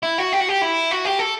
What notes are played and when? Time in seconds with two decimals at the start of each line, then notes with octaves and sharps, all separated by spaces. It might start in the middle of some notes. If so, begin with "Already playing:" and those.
0.03 E4
0.18 F#4
0.33 G4
0.40 F#4
0.49 G4
0.62 E4
0.91 F#4
1.05 G4
1.19 A4